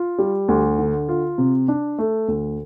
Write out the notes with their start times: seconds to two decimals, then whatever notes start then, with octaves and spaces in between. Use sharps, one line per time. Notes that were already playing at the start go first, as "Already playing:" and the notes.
Already playing: F4
0.19 G3
0.48 D2
0.79 D3
1.09 F4
1.38 C3
1.68 D4
1.98 A3
2.28 D2